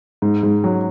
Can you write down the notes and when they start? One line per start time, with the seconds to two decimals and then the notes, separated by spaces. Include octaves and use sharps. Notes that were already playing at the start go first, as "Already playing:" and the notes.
0.22 G#2
0.43 G#2
0.64 F#3